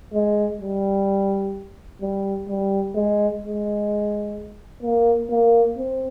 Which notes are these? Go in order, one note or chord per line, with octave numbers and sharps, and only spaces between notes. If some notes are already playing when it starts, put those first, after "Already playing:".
G#3
G3
G3
G3
G#3
G#3
A#3
A#3
C4